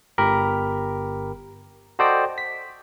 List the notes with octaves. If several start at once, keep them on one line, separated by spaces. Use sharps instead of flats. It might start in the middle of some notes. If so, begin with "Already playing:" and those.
G1 G4 A#4 B5
F#4 A4 C5 D5 D#5 G5
B6